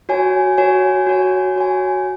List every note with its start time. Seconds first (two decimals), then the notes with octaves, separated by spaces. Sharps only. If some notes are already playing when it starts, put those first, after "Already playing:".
0.09 F#4 C#5 G#5
0.58 F#4 C#5 G#5
1.07 F#4 C#5 G#5
1.56 F#4 C#5 G#5